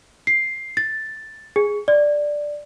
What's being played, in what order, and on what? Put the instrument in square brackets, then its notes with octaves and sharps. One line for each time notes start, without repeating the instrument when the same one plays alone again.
[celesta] C7
A6
G#4
D5